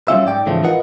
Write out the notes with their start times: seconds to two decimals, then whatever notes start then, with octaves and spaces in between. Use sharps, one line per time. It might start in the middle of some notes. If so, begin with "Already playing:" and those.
0.08 F#3 G3 C#4 F4 E5
0.26 G#2 D5 G5
0.46 G#2 C#3 E3 F3 A3
0.63 F4 A#4 B4 D#5 F#5